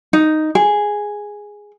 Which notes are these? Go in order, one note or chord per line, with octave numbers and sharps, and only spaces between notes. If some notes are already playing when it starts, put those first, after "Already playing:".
D#4
G#4